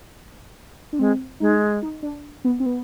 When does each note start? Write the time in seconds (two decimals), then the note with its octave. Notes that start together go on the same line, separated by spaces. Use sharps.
0.93 D4
0.99 G#3 C4
1.40 G#3 D#4
1.82 D#4
2.03 D4
2.45 B3
2.60 C4
2.66 B3